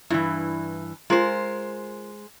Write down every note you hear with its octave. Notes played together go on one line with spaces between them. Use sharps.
G2 E3 E4
G#3 F4 A#4 C5